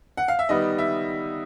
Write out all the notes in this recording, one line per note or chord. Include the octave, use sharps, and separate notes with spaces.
F#5
F5
E5
D#3 G3 B3 D#5
E5